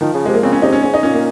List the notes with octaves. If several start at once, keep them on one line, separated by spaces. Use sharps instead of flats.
D#3 F3
C#3
C3 G#3
A#3
C#3 C4
C#4
C3 D#4
C#4
G#2 C#4
D#4
A#2 C#4
A#3